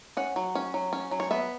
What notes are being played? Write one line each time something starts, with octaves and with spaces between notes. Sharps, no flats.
C#4 F#5
F#3
C#4
F#3
C#4
F#3
C#5
B3 E5